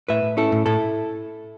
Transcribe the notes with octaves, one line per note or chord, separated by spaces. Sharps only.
A2 B4 E5
A2
C#4 E4 A4
A2
A2 E4 A4